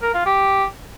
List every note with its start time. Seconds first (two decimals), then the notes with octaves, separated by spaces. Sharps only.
0.02 A#4
0.14 F4
0.26 G4